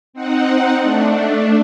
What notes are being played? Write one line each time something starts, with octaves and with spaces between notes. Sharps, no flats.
C4 D#4 F#5
A3 D4